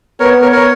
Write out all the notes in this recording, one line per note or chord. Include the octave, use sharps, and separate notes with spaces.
B3 A#4 C#5
A#4 C#5
A#4 C#5